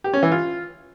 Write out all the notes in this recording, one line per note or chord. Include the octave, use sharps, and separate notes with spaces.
G4
C#4
E3
F4